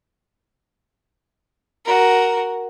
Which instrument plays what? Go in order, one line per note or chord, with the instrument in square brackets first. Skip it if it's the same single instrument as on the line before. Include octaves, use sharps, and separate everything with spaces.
[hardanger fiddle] F#4 A#4